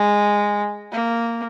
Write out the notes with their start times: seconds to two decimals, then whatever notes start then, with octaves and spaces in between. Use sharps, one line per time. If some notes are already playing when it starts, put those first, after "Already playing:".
Already playing: G#3
0.92 A#3